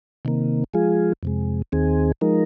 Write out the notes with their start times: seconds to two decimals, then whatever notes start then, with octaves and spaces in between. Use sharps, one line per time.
0.25 C3 D#3 A#3
0.74 F3 G#3 F4 G#4
1.23 F2 C3 G#3
1.72 D#2 D#3 C4 G#4
2.21 F3 G#3 D#4 A#4